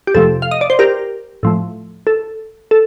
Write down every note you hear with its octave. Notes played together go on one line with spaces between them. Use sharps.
G4
F2 C3 F3 A3 A4
F5
D#5
D5
C5
G4 A#4
A2 F3 A3
A4
A4